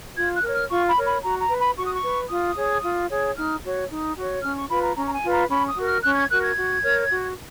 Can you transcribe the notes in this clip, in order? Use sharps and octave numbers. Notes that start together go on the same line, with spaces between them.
F4 G#6
F#6
A#4
C#5 F6
F4 C#6
B5
A#4 C#5
B5
F#4 A#5
A#5
B4
B5
F#4 C#6
D#6
C#6
B4
F4 D#6
G#4 C#5
F4
G#4 C#5
D#4 F6
F#4 C#5
D#4
F#4 C#5
C#4 F6
C#6
F4 B4 B5
A#5
C#4 A#5
A#5
G#5
F4 B4
A#5
C#4 B5
D#6
F#4 A#4
F6
C#4 F#6
G#6
F#4 A#4 F#6
G#6
F#4
A#4 C#5
F#4